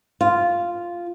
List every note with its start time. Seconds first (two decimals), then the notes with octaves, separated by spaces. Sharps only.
0.21 F4